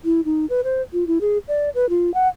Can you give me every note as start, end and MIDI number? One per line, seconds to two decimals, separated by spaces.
0.05 0.21 64
0.25 0.46 63
0.50 0.61 71
0.64 0.82 72
0.93 1.07 65
1.07 1.19 64
1.21 1.38 68
1.48 1.70 74
1.75 1.89 71
1.90 2.13 65
2.14 2.28 78